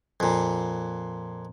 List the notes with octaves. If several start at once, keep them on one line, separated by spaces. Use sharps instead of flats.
F2 A#2